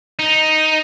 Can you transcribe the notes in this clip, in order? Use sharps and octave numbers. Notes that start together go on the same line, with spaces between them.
D#4